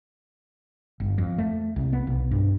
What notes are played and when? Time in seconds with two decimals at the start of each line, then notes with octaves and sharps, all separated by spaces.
1.00 G1
1.18 F2
1.38 A3
1.76 C2
1.93 B3
2.07 B1
2.31 G2